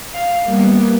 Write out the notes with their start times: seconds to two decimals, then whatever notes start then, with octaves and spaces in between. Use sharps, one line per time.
0.14 F5
0.46 G3 A#3 B3